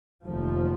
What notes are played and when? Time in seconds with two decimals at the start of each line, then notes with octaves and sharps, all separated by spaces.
0.25 F1 D#2 F3